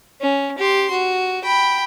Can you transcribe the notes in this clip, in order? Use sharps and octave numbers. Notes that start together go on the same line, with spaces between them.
C#4
G4 C6
F#4
G5 B5